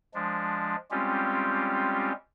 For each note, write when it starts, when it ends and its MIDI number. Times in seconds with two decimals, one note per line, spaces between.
0.14 0.76 53
0.14 0.76 56
0.14 0.76 62
0.91 2.12 55
0.91 2.12 56
0.91 2.12 60
0.91 2.12 61
0.91 2.12 65
0.91 2.12 67